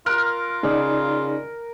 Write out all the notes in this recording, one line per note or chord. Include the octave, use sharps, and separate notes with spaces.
F4 A#4 F6 F#6
C#3 D#4 D5